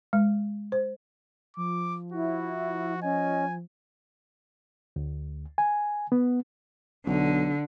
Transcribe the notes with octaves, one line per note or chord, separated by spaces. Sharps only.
G#3
C5
F3 D6
E4 F#4
C#4 D#5 G#5
D2
G#5
B3
B1 D3